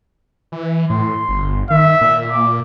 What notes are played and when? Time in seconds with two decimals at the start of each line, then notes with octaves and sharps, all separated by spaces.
0.52 E3
0.90 A2 C6
1.29 G1
1.70 D#3 E5
2.01 A#2
2.31 D6